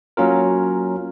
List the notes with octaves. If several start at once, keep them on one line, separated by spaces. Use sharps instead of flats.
F#3 A#3 C#4 F4 A#4